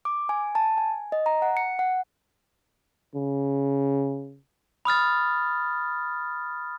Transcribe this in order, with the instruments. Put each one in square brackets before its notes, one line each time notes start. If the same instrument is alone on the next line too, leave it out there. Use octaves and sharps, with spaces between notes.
[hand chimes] D6
G#5
A5
G#5
D#5
A#5
F#5
C#7
F#5
[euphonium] C#3
[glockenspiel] B5 D#6 F6 A6